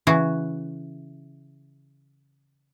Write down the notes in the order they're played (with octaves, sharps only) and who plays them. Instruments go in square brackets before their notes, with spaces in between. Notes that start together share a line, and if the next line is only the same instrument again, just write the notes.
[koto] C#3 E3 F#4